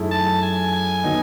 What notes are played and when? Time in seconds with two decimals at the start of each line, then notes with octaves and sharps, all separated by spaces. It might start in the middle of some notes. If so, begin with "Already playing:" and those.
Already playing: F#2 D#3 A3 E4 G#4
0.11 A5
0.43 G#5
0.73 G#5
1.04 D#3 F#3 B3 D#4